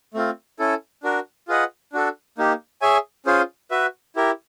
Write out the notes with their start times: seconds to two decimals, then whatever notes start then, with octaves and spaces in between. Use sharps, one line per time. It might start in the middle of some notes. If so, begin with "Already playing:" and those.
0.14 A3 C4 F4
0.59 C#4 E4 A4
1.03 D4 F#4 A#4
1.48 F4 G#4 B4 D#5 F#5
1.93 D4 F#4 A4
2.38 A#3 D#4 G4
2.82 G#4 C#5 E5 G#5
3.26 C#4 F4 G#4 C5
3.71 F#4 B4 E5
4.16 E4 G4 A#4